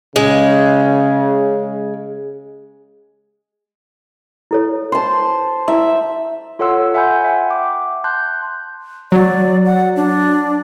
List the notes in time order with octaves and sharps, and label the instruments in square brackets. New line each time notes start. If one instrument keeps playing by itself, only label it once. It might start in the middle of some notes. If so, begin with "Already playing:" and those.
[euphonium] C#3 [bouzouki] G#3
[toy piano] E4 A4 C#5
[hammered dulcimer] C5 A5
[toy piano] E4 [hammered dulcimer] E5
[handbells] F4 A4 C#5 F#5 C6 E6
E5 F#5 G#5 B5 G6
E5 F#5 G5
D6
A5 C6 F#6 G6
[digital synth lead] F#3 [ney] D5
[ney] F#5
D4